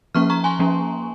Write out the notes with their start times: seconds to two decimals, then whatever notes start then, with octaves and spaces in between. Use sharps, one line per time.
0.15 F3 A#3 C#4 C#6 F6
0.30 A#5 C#6
0.44 G#5 C6
0.59 F3 A#3 C#4